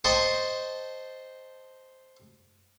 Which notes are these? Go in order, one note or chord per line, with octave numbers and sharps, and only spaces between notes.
C5 D#5 G5 A5 C#6